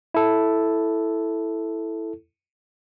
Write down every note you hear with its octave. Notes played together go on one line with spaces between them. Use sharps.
E4 A4